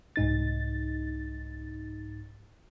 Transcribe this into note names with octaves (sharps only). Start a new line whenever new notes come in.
C2 G#2 D#4 A6